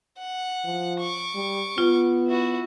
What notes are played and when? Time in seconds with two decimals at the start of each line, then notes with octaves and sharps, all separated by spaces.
0.18 F#5
0.65 F3
1.00 C#6 D6
1.35 G3
1.78 B3 F4
2.27 E4 F#4